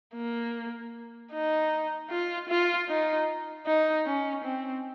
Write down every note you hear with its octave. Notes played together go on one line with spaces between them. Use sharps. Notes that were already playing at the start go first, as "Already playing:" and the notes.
A#3
D#4
F4
F4
D#4
D#4
C#4
C4